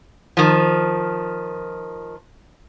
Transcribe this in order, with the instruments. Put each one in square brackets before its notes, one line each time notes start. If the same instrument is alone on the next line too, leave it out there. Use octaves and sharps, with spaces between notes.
[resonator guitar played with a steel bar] D#3 F3